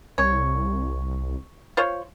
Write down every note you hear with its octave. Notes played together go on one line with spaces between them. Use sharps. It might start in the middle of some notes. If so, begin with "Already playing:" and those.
C2 C#5
F4 C5 C#5